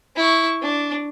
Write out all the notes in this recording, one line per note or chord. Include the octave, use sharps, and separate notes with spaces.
E4 C#6
D4